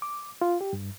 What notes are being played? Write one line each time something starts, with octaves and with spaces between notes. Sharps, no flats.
D6
F4
G4
G2